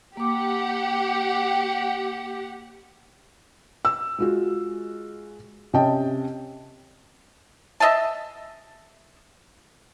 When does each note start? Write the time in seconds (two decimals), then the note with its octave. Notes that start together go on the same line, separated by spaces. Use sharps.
0.17 A#3 G4 F#5 D6
3.85 E6
4.18 G#3 F4 F#4
5.73 C3 C#4 D#5 G5 A5
7.80 D#5 E5 G#5 A5